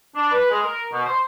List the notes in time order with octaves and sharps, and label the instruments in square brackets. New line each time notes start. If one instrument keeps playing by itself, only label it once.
[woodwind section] D4
B4
G#3
A#4
B2
C5